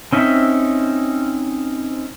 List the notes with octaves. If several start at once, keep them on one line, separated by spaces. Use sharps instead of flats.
C4 C#4 D#4 E5